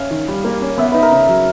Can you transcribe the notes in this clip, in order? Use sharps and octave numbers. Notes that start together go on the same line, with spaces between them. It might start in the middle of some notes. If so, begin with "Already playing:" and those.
Already playing: C#4 F5
D#3
G3
A#3
C#4
B3 E5
D#4 B4
A#4
C#3
F#3